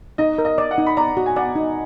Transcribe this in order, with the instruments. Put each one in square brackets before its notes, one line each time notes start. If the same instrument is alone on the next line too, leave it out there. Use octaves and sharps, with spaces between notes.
[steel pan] D#4 [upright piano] D#5
[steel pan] A#4
[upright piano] D#5
[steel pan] D5
[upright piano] F#5
[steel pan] D#4
[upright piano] B5
[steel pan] D5 [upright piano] A#5
[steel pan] F#4
[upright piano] G#5
[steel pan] D5 [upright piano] F#5
[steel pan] D#4